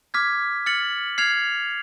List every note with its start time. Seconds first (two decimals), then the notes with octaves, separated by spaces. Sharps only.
0.14 D6 F6 G#6 B6
0.66 F6 A6 C#7 F#7
1.18 F6 G#6 C7 F7